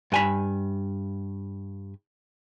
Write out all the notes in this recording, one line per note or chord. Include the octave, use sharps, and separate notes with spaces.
G2 G#5 B5